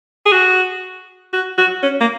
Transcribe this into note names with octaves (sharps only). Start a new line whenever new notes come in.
G#4
F#4
F#4
F#4
C#4
A#3